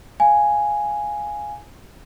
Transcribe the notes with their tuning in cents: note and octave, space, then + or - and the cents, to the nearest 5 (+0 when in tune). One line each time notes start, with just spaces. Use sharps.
F5 +0 G#5 +0